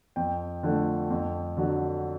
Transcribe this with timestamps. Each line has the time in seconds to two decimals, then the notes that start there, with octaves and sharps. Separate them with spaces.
0.16 F2 G5
0.63 D3 F3 A3
1.10 F2
1.57 D3 F#3